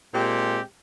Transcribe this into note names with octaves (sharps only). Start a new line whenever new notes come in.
A#2 G#3 C4 G4